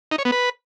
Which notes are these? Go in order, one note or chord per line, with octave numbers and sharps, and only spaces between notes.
D#4
C#5
B3
B4